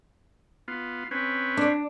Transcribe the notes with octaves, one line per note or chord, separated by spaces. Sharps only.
B3 F4
C4 C#4 B4
D4